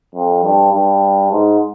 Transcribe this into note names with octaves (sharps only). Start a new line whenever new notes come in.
F2
G2
G2
G#2